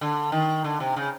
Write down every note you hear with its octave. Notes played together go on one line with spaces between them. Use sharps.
D3
D#3
D3
C3
C#3